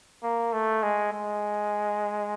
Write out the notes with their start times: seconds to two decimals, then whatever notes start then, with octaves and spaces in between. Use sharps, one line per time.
0.23 A#3
0.52 A3
0.83 G#3
1.13 G#3